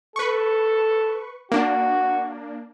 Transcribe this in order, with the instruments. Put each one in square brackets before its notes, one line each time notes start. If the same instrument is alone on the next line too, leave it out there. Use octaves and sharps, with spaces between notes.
[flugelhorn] A4 [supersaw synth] B4 C#6
[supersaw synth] A#3 D4 [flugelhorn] F#4